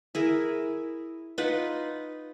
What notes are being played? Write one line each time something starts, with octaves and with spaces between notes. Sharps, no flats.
E4 G#4 A#4
D#4 F4 B4 F#5